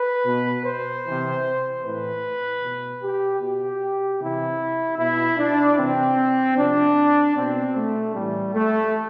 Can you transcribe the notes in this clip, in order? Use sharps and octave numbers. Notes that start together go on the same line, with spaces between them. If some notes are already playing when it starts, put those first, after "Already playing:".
Already playing: B4
B2
C5
C3 E3
A2 E3 B4
B2
G4
B2 G4
C3 E3 E4
B2 E4
D4
C3 E3 C4
C3 F3 D4
B2 C4
A3
A2 E3 G3
A3